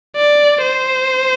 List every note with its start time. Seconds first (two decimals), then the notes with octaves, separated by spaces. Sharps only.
0.16 D5
0.62 C5